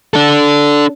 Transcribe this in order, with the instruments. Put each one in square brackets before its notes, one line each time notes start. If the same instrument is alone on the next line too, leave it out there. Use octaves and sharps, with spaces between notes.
[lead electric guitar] D4 A4